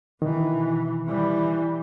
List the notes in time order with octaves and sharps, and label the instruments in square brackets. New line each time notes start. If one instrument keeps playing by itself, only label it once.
[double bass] B2 E3 [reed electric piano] D#3
[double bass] E3 G3